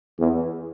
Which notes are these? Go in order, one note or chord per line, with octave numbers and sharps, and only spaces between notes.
E2